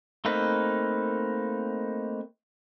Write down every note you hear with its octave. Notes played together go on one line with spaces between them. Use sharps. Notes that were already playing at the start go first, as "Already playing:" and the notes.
A3 A#3 C4 D#4 B4